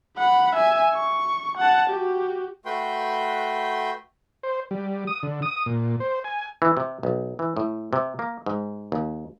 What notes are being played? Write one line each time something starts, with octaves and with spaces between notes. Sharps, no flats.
F#5 B5
E5 G#5
C#6
F#5 A5
F#4 G4
A3 F#4 B4 G5 C6
C5
G3
D#6
D3
D#6
A#2
C5
G#5
E3
C3
B1
E3
A2
C3
A#3
G#2
D#2